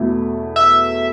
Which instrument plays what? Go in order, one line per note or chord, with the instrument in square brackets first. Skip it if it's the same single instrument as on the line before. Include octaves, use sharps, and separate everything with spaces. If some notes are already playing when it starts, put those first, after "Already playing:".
Already playing: [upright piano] E2 B2 A3 E4
[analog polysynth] E5